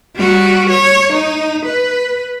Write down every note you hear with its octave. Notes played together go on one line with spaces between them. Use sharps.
G3 F#4
C#5
D#4
B4